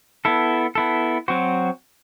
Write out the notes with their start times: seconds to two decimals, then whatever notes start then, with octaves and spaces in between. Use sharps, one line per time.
0.25 B3 E4 A4
0.75 B3 E4 A4
1.28 F#3 C4 F#4 C5